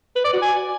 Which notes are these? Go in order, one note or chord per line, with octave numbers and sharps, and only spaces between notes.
B4
D5
F#4
G#5